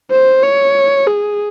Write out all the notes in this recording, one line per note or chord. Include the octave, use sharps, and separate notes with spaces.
C5
C#5
G#4